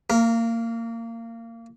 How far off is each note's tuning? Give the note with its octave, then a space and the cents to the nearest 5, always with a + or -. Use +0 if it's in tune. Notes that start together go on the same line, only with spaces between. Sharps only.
A#3 -25 A#4 +0